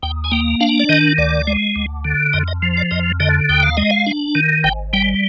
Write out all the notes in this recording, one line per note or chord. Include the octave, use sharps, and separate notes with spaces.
D#2 G5
G#5
A#3 G5
D4 F5
D5
D#3 D#5
D2 D5
G#3
D2
D3
F2 D#5
D#5
F3
D5
F2 D#5
D3 D#5
D#2 G5
F5
G#3 D#5
F5
D4
D#3
G#1 G5
G3 G5